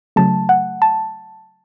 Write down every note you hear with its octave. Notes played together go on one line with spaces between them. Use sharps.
C#3 F#3 A3 A5
F#5
A5